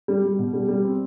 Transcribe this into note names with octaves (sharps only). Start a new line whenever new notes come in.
G3
G3
B2
G3
G3
C4